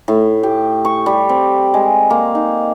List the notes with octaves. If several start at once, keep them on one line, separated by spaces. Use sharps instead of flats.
A2
G4
C#6
G3
C4
G#3
A#3
D#4